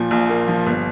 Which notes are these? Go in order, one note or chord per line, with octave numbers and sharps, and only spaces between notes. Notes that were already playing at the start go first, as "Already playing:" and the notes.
Already playing: A#2 F3 A#3
A#1
A#3
F3
G1